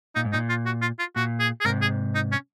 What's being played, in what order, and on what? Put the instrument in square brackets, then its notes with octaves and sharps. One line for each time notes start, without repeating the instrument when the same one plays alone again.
[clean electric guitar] A#2 [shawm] D#4
[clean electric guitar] G#2
[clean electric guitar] A#2 [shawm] D#4
[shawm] F4
F#4
F4
F4
[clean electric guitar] A#2 [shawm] F#4
[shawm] G#4
G#4
[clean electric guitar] G#2 C3 [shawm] A#4
[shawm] G#4
D#4
C#4